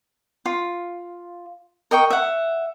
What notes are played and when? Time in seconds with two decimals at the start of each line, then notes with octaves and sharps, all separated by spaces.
0.46 F4
1.91 A#4 D#5 G5 C#6
2.10 E5 F#5